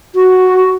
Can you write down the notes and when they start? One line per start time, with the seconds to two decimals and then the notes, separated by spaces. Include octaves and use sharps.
0.15 F#4